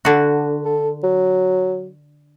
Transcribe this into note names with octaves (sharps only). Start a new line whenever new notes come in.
D3 F#4
A4
F#3